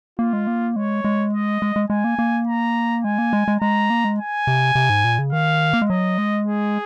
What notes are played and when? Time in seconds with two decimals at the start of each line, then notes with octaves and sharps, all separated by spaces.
0.19 A#3 F4
0.33 G#3
0.47 A#3
0.76 G#3 C#5
1.05 G#3
1.33 D#5
1.62 G#3
1.76 G#3
1.90 G#3 G#5
2.04 A#3
2.19 A#3
2.47 A#5
3.04 G#3 G#5
3.18 A#3
3.33 G#3
3.48 G#3
3.61 G#3 A#5
3.90 A#3
4.05 G#3
4.18 G#5
4.47 C3
4.75 C3
4.90 G#2
5.04 A#2
5.19 C#3
5.32 D#3 F5
5.73 A#3
5.82 G#3
5.90 F#3 D#5
6.18 G#3
6.47 G#4